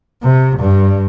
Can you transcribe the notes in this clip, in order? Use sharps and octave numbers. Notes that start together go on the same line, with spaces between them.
C3
G2